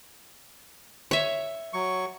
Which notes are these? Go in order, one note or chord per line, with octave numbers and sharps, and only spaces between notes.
C#5 E5
F#3 C#6